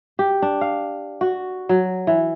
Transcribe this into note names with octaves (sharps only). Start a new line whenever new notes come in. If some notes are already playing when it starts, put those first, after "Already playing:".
G4
D4
F5
F#4
F#3
E3